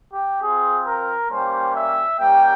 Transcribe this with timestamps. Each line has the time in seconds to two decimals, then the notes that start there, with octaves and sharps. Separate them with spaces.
0.12 G4
0.41 C4 F4 G#4
0.86 A#4
1.30 G3 A#3 C#4 G4 C5
1.75 E5
2.19 G3 A#3 C#4 G4 G5